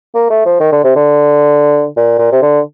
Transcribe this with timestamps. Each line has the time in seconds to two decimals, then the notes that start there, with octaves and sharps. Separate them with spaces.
0.15 A#3
0.30 A3
0.46 F3
0.60 D#3
0.72 D3
0.84 C3
0.95 D3
1.97 A#2
2.19 A#2
2.32 C3
2.42 D3